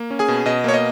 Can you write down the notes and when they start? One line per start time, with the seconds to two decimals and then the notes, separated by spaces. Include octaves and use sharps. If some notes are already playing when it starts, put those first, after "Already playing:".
Already playing: A#3
0.11 C#4
0.19 G#4 G#5
0.28 B2
0.46 B2 D#5
0.64 A#3 C#5
0.74 D#5